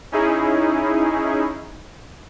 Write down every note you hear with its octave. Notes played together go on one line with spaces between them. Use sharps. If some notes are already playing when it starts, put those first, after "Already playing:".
C#4 D#4 E4 G#4